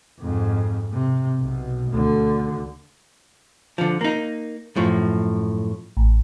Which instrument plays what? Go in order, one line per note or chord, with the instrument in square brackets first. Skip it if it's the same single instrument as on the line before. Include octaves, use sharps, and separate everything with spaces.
[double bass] F2 G#2
C3
B1 B2
D2 D3
[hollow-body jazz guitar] D3 F3
A#3 D#4
F#2 A2 F3
[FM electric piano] A1